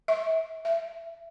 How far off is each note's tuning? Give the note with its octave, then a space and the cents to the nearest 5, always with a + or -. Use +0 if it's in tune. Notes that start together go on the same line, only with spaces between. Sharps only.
E5 -25
E5 +20